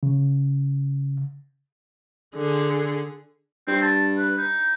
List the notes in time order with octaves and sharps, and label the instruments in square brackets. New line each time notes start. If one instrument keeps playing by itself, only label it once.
[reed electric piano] C#3
[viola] D3 G#4
[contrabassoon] G2 [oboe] C4
[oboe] A5
B4
D#4